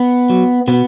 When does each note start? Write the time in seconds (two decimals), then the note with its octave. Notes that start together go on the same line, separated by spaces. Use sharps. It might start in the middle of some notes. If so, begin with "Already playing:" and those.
Already playing: B3
0.30 F#3
0.68 B2 B3